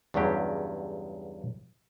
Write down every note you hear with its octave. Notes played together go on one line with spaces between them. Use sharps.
E2 G2 C#3 F#3 G4